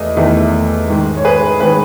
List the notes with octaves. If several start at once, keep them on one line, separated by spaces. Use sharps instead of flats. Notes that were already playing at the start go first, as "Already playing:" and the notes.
Already playing: E2 A3 D#5
E2 D#3 A3
G#2 D#3 G#3
C#5
G#4 B4
D#3 G#3 G#4 B4